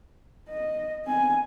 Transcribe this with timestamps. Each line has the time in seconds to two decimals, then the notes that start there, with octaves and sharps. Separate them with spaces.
0.49 D#5
1.05 C4 G#5